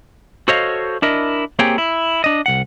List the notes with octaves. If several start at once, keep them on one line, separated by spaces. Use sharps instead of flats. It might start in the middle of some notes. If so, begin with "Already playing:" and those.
F#4 A4 C5 C#5 D#5 F5
D4 E4 A#4 D#5
A#3 C4 G4 G#4 C#5 G5
E4
D4 D#5
C2 F#5